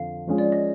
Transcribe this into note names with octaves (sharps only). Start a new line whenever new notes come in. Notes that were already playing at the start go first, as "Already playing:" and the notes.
Already playing: F2 D3 F5
F3 G#3 C#4 F4 G#4
D5
D#5